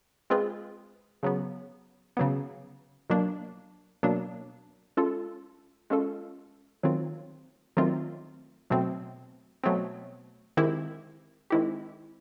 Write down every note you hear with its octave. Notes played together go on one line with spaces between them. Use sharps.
G#3 C4 F4 G#4 B4
C#3 F#3 B3
C#3 F#3 B3
B2 F#3 A#3 D4
B2 F#3 A#3 D4
G#3 C#4 F4 A4
G#3 C#4 F4 A4
D#3 F#3 A3 C4 F4
D#3 F#3 A3 C4 F4
B2 F#3 A3 C4
B2 F#3 A3 C4
D#3 G#3 C4 E4 G4
D#3 G#3 C4 E4 G4